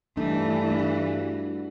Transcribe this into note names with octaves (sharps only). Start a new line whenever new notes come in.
G2 E3 A3 D4 D#4
F#4